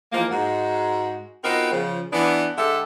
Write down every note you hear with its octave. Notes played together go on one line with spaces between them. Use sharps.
E3 F3 G#3 A#3
G#2 G#3 F#4
B3 C4 D#4 F4 F#4 A#4
C#3 F3
E3 B3 D4
D3 G#3 G4 A4 E5